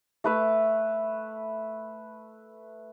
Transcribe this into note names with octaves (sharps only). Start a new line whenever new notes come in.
A3 B4 E5